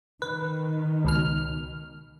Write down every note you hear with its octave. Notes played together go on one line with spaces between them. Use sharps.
D#3 B4
C#2 B2 F6